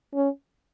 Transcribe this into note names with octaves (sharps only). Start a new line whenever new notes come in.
C#4